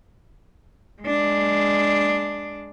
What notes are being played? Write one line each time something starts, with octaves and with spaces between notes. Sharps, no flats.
G#3 D4